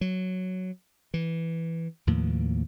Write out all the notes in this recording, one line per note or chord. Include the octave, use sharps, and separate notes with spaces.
F#3
E3
D#2 A2 F3 A#3